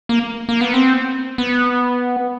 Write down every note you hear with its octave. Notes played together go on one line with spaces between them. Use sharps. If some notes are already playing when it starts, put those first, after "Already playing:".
A#3
A#3
B3
C4
B3